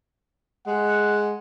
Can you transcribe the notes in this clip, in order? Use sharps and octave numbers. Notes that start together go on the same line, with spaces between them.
G#3 F#5